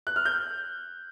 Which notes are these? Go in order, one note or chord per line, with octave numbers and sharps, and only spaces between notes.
F#6
F6
G6